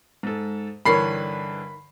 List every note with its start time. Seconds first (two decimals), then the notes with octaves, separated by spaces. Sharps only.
0.23 G#2 A4
0.85 G2 D3 E3 D#4 A#4 C#5 B5 C7